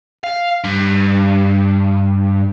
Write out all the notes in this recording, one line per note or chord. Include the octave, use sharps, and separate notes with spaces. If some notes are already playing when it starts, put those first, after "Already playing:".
F5
G2